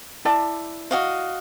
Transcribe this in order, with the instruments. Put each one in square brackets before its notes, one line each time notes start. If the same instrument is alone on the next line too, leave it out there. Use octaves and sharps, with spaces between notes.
[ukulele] E4 D5 A5
[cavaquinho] F#4 D#5 F5